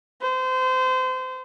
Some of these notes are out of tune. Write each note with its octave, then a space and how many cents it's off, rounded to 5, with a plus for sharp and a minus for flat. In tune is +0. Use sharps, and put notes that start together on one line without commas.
C5 -30